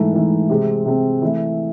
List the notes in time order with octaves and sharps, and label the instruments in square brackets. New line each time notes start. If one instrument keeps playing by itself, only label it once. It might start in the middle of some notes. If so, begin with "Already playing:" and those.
Already playing: [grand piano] G#2 E3 A3
G#2 E3 A3
C3 G#3 C4
C3 G#3 C4
E3 A3 E4